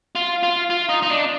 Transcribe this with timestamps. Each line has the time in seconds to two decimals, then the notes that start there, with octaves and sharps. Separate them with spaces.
0.15 F4
0.43 F4
0.70 F4
0.89 D#4
1.02 D#4
1.10 D4